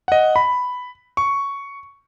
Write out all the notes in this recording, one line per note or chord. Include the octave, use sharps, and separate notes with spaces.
D#5 F#5
B5
C#6